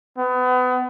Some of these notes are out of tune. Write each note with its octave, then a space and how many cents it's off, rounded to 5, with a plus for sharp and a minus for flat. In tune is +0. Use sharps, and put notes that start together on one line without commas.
B3 +30